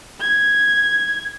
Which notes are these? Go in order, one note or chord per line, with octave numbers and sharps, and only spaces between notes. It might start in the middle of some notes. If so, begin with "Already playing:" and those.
G#6